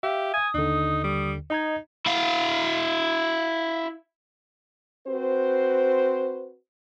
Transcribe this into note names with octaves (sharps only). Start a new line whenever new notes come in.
G4 E5 F5
G#5 D#6
D#2 D3 D#4
G3
D#4 D#5 A#5 G#6
E4 F5
C4 F#4 B4 C5